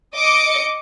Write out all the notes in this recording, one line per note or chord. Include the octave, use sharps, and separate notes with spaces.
D#5 D6 C#7